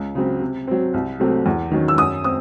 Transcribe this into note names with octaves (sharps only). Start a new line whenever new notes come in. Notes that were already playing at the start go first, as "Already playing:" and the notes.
Already playing: C#2
C#3 F#3 C4
C3
F#3 C4
C2
C3 F#3 A3 C4
E2
D#3 F#3 C#4
E6
F#2 D#6
C4 D#6